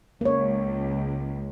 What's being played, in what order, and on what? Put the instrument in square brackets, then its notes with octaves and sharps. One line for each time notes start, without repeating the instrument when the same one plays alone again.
[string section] C#2 [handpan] A#3 C#5